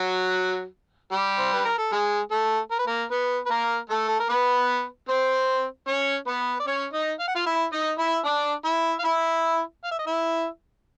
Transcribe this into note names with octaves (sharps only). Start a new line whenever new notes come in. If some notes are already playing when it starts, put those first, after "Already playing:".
Already playing: F#3 F#4
G3 G4
C5
B4
A#4
A4
G#3 G#4
A3 A4
A#4
B4
A#3 A#4
B3 B4
B4
A#3 A#4
A3 A4
A4
A#4
B3 B4
C4 C5
C#4 C#5
B3 B4
D5
C#4 C#5
D#4 D#5
F5
F#5
F4 F5
E4 E5
D#4 D#5
E4 E5
D4 D5
E4 E5
F5
E4 E5
F5
E5
D#5
E4 E5